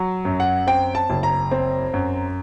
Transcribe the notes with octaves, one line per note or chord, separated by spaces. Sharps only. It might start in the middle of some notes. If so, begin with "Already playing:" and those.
Already playing: F#3
F#2
F#5
C4 G5
A5
F#1
A#5
C4
F#2